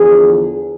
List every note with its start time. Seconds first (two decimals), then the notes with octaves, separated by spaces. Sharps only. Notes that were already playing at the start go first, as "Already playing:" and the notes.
Already playing: E2 D3 F3 G#4